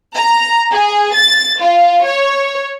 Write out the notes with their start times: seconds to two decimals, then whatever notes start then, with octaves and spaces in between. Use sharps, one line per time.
0.16 A#5
0.71 G#4
1.16 A6
1.63 F4
2.06 C#5